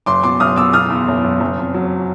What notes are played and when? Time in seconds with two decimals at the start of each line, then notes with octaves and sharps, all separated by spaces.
0.06 F#1 C6 D6
0.23 B2 C6 D6
0.40 F#1 D#6 F6
0.56 B2 D6 E6
0.73 B2 D#6 F6
0.90 E2
1.08 F#1
1.24 F#1
1.40 F#1
1.58 F2
1.74 F#3